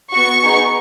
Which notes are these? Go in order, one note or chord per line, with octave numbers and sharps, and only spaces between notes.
B3 F#4 C#6
B3 D#4 G#4